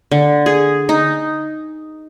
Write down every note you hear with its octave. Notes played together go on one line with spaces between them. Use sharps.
D3
G#4
D#4